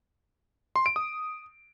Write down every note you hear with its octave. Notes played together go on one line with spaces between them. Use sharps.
C6
D7
D#6